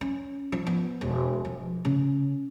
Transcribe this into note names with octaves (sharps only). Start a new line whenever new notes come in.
C#4
F3
B3
E1
F3
C#3